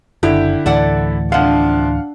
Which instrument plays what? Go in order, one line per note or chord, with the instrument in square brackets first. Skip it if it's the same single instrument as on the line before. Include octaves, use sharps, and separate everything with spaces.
[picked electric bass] F#1 [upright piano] D3 E4 [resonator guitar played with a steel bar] G4
[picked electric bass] D2 A2 E3 [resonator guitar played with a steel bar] A4 D5 F#5
[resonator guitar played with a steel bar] C3 F3 [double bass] D4 [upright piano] F5 F#5